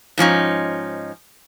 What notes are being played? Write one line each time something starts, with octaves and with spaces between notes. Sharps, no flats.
G#2 F3 C#4 D#4